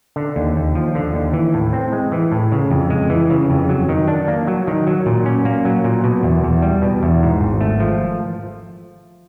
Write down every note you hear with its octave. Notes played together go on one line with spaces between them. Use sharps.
D3
D#2
D#2
F3
D3
D#2
E3
A2
C4
G#3
E3
A2
C#3
F2
G#3
E3
C#3
F2
F#3
D#3
D4
A#3
F#3
D#3
F#3
A#2
C#4
A#3
F#3
A#2
B2
E2
E2
G3
B2
E2
G#2
G#1
A3
F3